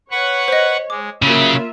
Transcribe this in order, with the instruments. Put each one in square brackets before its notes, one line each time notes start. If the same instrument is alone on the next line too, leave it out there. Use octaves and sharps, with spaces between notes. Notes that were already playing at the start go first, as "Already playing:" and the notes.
[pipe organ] B4 F#5 C#6 [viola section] C#5
[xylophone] C5 D#5
[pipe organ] G#3 [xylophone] D6
[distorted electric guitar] C#3 [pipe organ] F#3 B5 [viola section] A#3 F4 E5